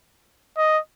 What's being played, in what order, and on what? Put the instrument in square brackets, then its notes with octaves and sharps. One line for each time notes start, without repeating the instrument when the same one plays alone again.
[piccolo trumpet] D#5